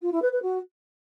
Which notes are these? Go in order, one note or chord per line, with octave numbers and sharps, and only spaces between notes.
F4
E4
B4
B4
F#4